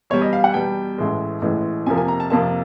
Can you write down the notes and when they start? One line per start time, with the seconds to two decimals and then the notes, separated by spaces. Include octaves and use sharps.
0.10 E2 B2 G3 C#5
0.22 D#5
0.33 F5
0.44 F#5
0.54 E2 B2 G3 G5
0.98 A1 A2 E3 G#3
1.42 A1 A2 E3 G#3
1.86 F2 C3 F3 A#3 G#5
1.98 G#5
2.08 A#5
2.20 A5
2.30 F2 C3 F3 A#3 A5